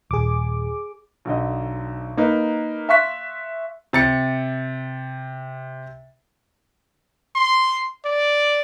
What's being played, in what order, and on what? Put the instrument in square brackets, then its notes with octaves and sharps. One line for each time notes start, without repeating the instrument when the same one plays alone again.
[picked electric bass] D#1 [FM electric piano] G#4 D6
[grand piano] B1 D3 D#5
A#3 D#4 B4
E5 F5 C6 C#6 F#6 B6
C3 A6 C#7
[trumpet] C6
D5